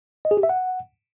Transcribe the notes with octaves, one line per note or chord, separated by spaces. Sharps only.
D#5
G#4
G4
E5
F#5